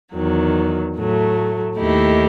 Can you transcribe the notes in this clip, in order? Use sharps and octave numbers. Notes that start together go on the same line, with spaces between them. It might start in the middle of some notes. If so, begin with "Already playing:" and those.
E2 D#3 F#3
A2 F#3 A3
D#2 D#3 A3 E4 G4